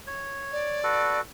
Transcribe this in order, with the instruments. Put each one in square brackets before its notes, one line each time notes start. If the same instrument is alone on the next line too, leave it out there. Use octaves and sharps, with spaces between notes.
[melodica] C#5
[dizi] D5
[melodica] F#4 A4 B4